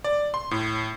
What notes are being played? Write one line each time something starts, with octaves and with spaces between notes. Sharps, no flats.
D5
C6
A2